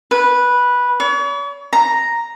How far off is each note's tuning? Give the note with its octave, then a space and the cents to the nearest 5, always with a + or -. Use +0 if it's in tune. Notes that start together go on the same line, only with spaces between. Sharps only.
B4 -10
C#5 +40
A#5 +0